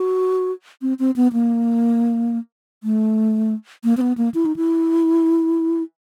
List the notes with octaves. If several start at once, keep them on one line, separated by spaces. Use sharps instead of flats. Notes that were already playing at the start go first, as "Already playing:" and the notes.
Already playing: F#4
C4
C4
B3
A#3
A3
A#3
C4
B3
A#3
E4
D#4
E4